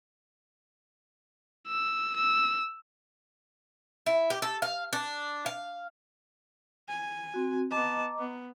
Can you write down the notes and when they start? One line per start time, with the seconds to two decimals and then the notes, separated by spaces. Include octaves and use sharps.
1.68 E6
2.16 E6
4.06 E4
4.30 G4
4.42 A4
4.62 F5
4.93 D4
5.46 F5
6.88 G#5
7.34 C4 F#4
7.71 B3 D#5 A5 A#5 D6
8.19 B3